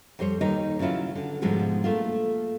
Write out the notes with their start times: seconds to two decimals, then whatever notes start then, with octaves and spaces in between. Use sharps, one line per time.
0.19 F2 G3 C5 C#5
0.41 D#2 D#3 G3 D#4 C#5 D#5
0.79 C#3 F#3 C#4 E4 F4
1.15 D3 F#4
1.42 G#2 B2 D3 F3 G3 G#3
1.84 A3 A#3 F4